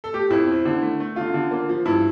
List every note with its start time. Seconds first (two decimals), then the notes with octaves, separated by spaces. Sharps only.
0.04 A4
0.13 A3 G4
0.30 F2 E4
0.47 C4
0.65 D3
0.82 A3
1.00 A3
1.16 D3 F4
1.34 D3
1.51 A#3
1.69 F3
1.86 G2 E4